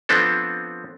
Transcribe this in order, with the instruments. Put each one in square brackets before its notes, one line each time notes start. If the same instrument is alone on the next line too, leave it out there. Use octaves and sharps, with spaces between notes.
[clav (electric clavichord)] F3 B3 C4 D4 A4